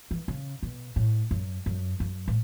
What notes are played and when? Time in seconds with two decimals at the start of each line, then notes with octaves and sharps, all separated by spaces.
0.11 E3
0.28 C#3
0.63 B2
0.96 A2
1.31 F#2
1.66 F#2
2.00 F#2
2.28 A2